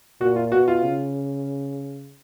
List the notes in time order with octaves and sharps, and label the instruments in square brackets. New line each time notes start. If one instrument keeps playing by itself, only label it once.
[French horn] A#2 [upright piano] F#4
[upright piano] F4
[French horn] B2 [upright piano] F#4
[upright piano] F4
[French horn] C#3